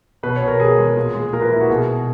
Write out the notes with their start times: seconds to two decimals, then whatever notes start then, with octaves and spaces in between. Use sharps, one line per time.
0.23 B2 B4
0.36 C#5
0.42 B2
0.48 A#4
0.60 B2 G#4
0.78 G#3
0.97 A#2
1.15 G#3
1.33 A#2 A#4
1.42 B4
1.52 A#2 E4
1.61 F#4
1.69 B2 G#4
1.88 B2